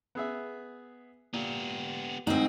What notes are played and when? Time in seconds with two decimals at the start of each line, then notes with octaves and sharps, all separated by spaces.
0.15 B3 G#4 E5
1.33 A#2 B3 G4
2.27 D2 G#2 C4 D#4 F#4